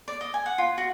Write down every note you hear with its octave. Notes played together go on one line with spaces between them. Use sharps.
D5
D#5
G#5
F#5
F4
F#4